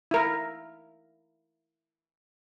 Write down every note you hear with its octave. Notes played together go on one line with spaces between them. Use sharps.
E4 A#4